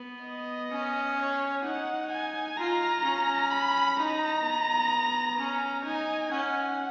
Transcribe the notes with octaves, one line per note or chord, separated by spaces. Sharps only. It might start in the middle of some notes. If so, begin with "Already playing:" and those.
Already playing: B3
D#5
C#4
C#5
D#4 F#5
G#5
F4 A#5
C#4
B5
D#4 A#5
B3
C#4
D#4 G#5
C#4 F#5